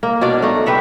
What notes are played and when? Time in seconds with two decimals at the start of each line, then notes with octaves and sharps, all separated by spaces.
0.03 A#3
0.21 B2 D4 C#5 D5
0.42 A3 D#4
0.66 G4 B4 E5 F#5